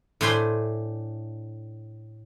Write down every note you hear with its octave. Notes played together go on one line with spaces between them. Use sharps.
A2 D4 C5 G#5 B5 C6